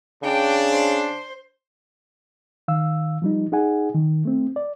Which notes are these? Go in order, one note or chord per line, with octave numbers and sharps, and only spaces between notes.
C#3 D4 G5
C5
D#3 F5 E6
F3 G3 D#4
D#4 G#4 F#5 G#5
D#3
A3 C4
D5